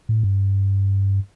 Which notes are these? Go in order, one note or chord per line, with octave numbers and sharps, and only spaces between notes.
A2
G2